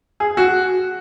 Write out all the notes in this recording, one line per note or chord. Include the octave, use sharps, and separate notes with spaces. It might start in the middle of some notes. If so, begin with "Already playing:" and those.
G#4
F#4